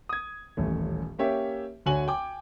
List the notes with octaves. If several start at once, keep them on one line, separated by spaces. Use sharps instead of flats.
D#6 G#6
D#1 A1 A3
A#3 C#4 G4 C#5 E5
D2 D3 F#4 C#5 G#5 F#7
G5 G#5 D6